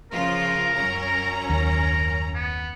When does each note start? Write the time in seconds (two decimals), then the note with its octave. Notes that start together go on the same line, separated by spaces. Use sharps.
0.12 C#3 F3 F4 A#4
0.75 F#2 C#4 A#5
1.50 D#2 A#4
2.34 B3